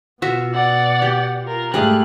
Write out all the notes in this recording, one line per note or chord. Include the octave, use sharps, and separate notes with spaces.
B2 F4 F#4 E5
D5 F#5
G4
F4 A#4
G#2 G3 A3 G#4 F5 F#6